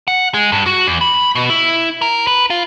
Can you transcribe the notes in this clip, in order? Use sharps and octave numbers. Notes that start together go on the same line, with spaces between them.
F#5
G#3
G2
F#4
E2
B5
B2
E4
A#4
B4
F4